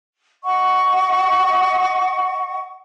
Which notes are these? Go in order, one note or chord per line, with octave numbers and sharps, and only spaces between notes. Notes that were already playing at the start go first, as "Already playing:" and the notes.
D#5 F#5 C#6